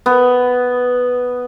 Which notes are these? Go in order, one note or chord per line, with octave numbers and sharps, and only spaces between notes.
B3